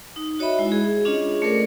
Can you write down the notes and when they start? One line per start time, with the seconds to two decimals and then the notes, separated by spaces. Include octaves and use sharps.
0.16 D#4
0.39 F#4 C#5 D#5 E5 B5
0.59 G#3 E4 F#4
0.72 G#4
1.05 C#4 D4 F4 G#4 C#5 D#5
1.42 A3 A4 A#4 C5 D5